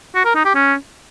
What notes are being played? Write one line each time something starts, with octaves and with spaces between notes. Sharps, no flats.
F#4
A#4
D#4
G4
C#4